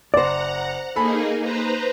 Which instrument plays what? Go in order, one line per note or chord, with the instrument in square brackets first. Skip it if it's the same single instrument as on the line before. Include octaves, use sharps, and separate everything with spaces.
[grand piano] F#1 [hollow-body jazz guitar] C5 D5 [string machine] F#5 A#5
[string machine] A#3 D#4 G#4 [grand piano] A4 G#5 B5
[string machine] B4 C5 A#5